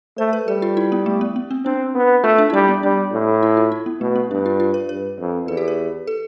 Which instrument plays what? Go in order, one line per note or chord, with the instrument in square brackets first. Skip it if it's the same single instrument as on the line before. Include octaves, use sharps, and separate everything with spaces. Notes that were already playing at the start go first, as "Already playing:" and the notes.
[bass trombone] A3 [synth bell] C5
[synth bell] B4
[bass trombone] G3 [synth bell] A4
[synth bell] F4
E4
B3
A3
B3
B3
C4
[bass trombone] C4 [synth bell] D4
[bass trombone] B3
[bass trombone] A3 [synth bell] F4
[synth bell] D4
E4
[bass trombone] G3 [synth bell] D4
[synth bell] B3
[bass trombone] G3 [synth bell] D4
[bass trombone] A2
[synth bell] E4
F4
E4
B3
[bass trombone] B2 [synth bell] A3
[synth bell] B3
[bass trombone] G2 [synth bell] D4
[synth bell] F4
F4
B4
[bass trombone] G2 [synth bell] B4
[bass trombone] F2
[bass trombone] E2 [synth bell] A4
[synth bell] G4
B4
A4